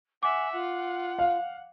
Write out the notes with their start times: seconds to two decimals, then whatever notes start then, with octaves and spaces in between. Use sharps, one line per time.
0.23 E5 F#5 G#5 D6
0.53 F4 F#5
1.19 F5